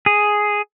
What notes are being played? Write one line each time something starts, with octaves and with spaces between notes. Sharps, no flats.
G#4